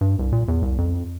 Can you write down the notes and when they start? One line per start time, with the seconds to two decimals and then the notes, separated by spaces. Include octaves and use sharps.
0.01 G2
0.19 C2
0.32 A#2
0.48 E2
0.62 C2
0.78 F2